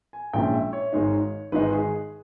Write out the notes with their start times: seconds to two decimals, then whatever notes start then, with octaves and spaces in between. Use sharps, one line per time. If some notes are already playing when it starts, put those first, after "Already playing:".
0.13 G#5
0.33 A#1 A#2 G#3 C#4 E4 G5
0.54 E5
0.73 C#5
0.93 G#1 G#2 D#3 G#3 D#4
1.52 G#1 G#2 D#3 G#3 D#4 B4
1.72 G#4